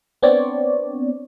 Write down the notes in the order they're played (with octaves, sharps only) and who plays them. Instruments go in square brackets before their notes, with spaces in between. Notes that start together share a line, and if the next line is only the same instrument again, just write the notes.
[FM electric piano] B3 C4 D4 C#5 D5